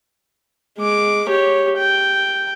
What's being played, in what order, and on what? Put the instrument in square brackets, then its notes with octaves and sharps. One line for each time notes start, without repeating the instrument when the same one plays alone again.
[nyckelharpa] G#3 D6
G4 C#5
G5